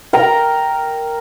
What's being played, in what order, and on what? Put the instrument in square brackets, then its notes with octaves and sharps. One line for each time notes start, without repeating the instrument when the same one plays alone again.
[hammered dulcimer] A#4 G5 A#5